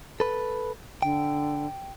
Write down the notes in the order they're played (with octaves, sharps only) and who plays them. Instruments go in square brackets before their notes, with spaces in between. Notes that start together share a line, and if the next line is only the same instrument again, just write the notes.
[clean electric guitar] A4 B4
[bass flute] D3 [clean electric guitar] G5